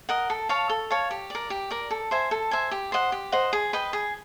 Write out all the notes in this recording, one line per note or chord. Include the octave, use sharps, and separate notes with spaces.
A#4 D#5 F#5
A4
C#5 F5 A5
A4
C#5 F5 A5
G4
A#4 D5
G4
A#4 D5
A4
C5 E5 G#5
A4
C5 E5 G#5
G4
C5 D#5 F#5
G4
C5 D#5 F#5
G#4
B4 D#5 G5
G#4